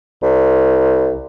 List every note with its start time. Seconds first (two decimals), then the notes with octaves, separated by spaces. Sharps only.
0.23 C2